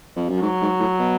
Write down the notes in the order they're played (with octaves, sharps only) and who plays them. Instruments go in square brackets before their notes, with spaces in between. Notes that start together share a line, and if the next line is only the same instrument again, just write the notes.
[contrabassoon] F2
F#2
[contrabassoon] G#2 [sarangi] F#3
[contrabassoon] G#2
A2
B2